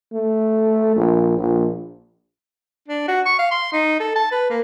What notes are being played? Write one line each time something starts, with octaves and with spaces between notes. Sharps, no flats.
A3
A#1
A#1
D4
F#4
C#6
F5
C6
D#4
A4
A5
B4
A#3